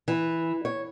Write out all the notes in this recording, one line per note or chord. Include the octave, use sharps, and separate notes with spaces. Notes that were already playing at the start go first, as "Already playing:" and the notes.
E3
C#5